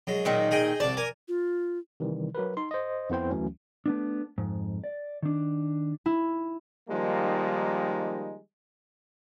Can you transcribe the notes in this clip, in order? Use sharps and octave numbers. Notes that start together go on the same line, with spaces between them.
F#2 G#3
A#2 D#3 D#4
G#4 D#5 G5
C2 D4 D5 A5
A#4 G#5
F4
C3 D#3 E3 G3
F#3 F#4 A#4 B4
D#4 C6
C5 D#5
F2 B3 E4 C5 G5
D2 E3 F#3 A3 C#4
A3 B3 D4
F2 G#2
D5
D#3 D4
E4
D#3 F3 G3 G#3 A#3 D#4